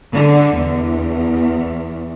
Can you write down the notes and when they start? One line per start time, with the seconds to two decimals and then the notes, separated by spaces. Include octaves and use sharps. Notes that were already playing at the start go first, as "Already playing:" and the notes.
0.12 D3
0.54 E2